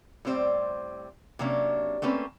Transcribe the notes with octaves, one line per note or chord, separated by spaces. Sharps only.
A2 G3 C4 C5 D5
C3 F#3 A#3 C#4 D4
A3 A#3 C4 C#4 B4